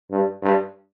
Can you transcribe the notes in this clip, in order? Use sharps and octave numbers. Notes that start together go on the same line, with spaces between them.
G2
G2